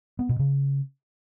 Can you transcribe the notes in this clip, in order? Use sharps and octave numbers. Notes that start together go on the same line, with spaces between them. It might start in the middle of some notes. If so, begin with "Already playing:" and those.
B3
B2
C#3